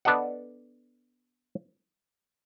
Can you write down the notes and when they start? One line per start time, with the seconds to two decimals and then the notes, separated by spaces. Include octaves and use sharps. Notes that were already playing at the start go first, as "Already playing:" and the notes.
0.05 B3 D4 A4 D#5 F#5